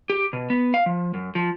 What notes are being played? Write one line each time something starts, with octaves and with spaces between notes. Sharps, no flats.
G4
B2
B3
F5
F3
F#2
F3